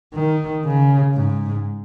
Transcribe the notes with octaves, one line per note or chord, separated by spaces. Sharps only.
D#3
C#3
G#2